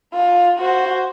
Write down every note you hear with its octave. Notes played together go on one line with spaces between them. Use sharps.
F4
F#4 C5